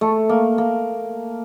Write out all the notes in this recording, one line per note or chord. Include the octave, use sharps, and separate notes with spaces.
A3
A#3
A#3